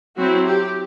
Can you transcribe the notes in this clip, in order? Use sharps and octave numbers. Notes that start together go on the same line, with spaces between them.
F#3 C4 E4 F#4
G4